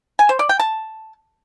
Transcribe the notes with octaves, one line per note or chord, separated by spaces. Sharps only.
G#5
C5
D5
G5
A5